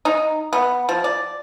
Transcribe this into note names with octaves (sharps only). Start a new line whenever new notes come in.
D#4
B3
F3
D5